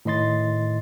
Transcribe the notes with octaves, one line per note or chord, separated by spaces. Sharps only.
A2 D#3 D#5 C6 A6